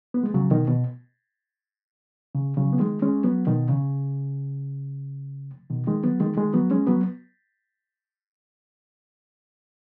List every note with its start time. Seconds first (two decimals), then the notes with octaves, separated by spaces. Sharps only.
0.14 B3
0.23 G#3
0.34 C#3 F#3
0.51 B2 D#3
0.68 B2
2.35 C#3
2.57 C#3 F#3
2.73 B3
2.80 D#3 G#3
3.02 G#3 C#4
3.24 F#3 B3
3.47 B2 D#3
3.69 C#3
5.70 B2 D#3
5.87 D#3 G#3
6.04 F#3 B3
6.20 D#3 G#3
6.37 D#3 G#3
6.54 F#3 B3
6.71 G#3 C#4
6.87 F#3 B3